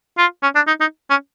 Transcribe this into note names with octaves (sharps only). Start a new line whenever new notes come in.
F4
C#4
D4
D#4
D#4
C#4